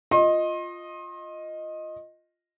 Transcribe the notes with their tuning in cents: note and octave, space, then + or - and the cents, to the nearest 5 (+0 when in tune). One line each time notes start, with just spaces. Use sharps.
F4 +0 D#5 +0 C6 +35